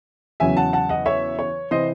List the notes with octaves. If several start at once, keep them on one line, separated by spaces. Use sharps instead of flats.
E2 C#3 F#3 C#4 E5 G#5
F#5 A5
F#5 A5
D#5 F#5
C#5 E5
C#5
C3 E3 C5 D#5